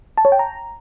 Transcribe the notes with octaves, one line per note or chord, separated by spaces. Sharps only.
A5
C#5
G5
A#5